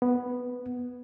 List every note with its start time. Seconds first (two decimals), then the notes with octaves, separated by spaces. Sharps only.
0.02 B3